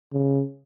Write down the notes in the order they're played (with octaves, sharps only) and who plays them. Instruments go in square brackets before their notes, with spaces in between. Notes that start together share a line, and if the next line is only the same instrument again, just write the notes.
[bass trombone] C#3